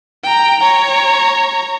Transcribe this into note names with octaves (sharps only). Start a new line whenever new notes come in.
G5 A#5
C#5 A#5